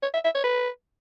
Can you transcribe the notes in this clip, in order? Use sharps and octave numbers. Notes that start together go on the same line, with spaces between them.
C#5
E5
E5
C#5
B4